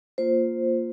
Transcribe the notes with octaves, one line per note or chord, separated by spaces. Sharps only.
A#3 F4 C5